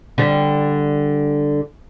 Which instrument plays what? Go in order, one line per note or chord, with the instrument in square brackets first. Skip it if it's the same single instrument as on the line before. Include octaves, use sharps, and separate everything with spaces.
[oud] D3 G3